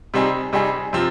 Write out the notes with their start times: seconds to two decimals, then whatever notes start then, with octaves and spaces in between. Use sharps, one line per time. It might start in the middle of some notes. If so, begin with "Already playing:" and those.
0.14 C3 G3 C4 D#4 G#4
0.53 C3 G3 C4 D#4 G#4
0.93 C3 F3 C4 F4